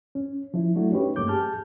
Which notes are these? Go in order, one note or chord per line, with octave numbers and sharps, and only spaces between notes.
C#4
F3 E4
F#3 A3 D4 E4 F#4
C#4 D#4 G4 B4 C#5
G2 A3 A#3 D6 G6
G4 G#4 A5 F6 G6